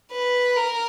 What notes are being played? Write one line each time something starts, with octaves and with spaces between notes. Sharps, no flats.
B4
A#4